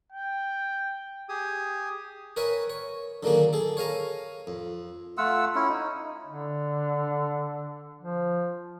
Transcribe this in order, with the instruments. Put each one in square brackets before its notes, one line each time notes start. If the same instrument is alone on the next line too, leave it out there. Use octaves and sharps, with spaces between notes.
[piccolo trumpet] G5
[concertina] G4 G#4 D#6
[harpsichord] A#4 B4 C#5 E5 G#5
C#5
D3 D#3 F#3 A#3 G#4
G#4 A4
C#5 F5 G#5 A#5
F2
[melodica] A3 F4 F#5 E6
C#4 E4
D#4
[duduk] D3
F3